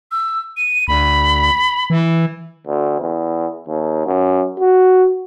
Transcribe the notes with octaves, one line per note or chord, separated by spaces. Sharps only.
E6
D#7
D2 B5
E3
D2
E2
D#2
F#2
F#4